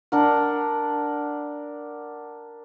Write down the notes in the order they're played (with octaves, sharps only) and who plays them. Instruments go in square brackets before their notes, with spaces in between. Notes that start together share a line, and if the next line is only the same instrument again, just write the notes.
[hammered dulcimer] D4 A#4 F#5